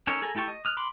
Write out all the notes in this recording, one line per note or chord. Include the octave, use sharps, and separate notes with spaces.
C#4 D#4 A4 A#4 C#5
G#4 A4 G#5 A#5
A3 E4 G4 A5 C#6
D#5
D#6 F6 F#6
B5 C6 D6